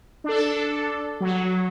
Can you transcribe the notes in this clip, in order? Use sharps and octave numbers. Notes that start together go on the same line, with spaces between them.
D4 A4
F#3